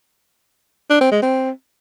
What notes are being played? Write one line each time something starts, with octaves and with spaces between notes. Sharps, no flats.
D4
C4
G#3
C4